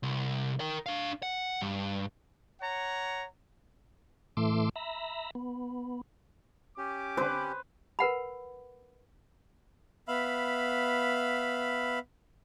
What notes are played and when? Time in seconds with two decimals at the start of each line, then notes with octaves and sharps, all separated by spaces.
0.03 C2
0.60 A#4 G5
0.86 D4 F5
1.23 F#5
1.61 G2
2.61 C#5 F#5 A#5
4.37 A2 E3 A3 C6 D6 E6
4.76 E5 A#5 B5
5.35 B3
6.78 C#4 G4 D6
7.17 D3 C4 B4 C5
7.99 A#4 B4 F#5 B5
10.08 B3 E5 F5 B5